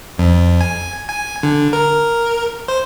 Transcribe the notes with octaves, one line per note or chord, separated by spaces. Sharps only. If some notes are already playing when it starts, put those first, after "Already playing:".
F2
G#5
G#5
D3
A#4
C5